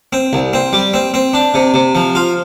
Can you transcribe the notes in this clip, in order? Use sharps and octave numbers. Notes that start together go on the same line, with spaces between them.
C4
C2
C4
G3
C4
C4
D4
C3
C3
F3
F4